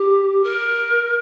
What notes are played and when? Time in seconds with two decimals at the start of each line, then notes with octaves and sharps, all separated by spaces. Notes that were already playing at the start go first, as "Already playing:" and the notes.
Already playing: G4
0.43 A#4